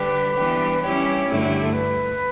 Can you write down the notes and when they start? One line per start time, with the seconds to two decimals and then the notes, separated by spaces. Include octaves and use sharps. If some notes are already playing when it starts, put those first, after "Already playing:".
Already playing: D3 G3 D4 G4 B4
0.36 E3 G3 B3 D4 G4
0.82 G3 C#4 E4 G4 C#5
1.27 G2 D3 A3 E4
1.39 F#4
1.50 G4
1.62 A4
1.73 B4